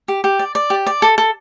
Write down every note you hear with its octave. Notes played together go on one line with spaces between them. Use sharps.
G4
G4
D5
D5
G4
D5
A4
A4